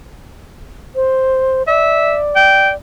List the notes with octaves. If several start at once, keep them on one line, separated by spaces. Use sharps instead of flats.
C5
D5 E5
G5